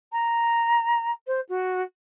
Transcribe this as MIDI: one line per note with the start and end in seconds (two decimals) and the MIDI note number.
0.12 1.11 82
1.27 1.40 72
1.48 1.81 66